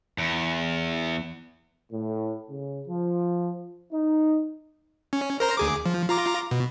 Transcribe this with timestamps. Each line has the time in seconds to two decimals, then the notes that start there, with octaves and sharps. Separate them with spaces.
0.18 E2
1.91 A2
2.49 C#3
2.87 F3
3.92 D#4
5.13 C#4
5.40 A#4 C5 A#5
5.57 D2 G#4 D6
5.86 F3
6.09 F4 A#5 D6
6.51 B2